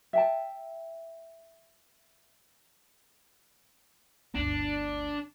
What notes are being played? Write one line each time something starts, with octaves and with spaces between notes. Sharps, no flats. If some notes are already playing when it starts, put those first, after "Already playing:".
E5 G5 A5
G1 D2 D4